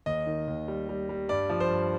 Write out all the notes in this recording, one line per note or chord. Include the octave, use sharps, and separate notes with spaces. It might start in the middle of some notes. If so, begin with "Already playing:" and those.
D#2 D#5
D#3
D#2
G3
G3
G3
G2 D5
F3
C5
G2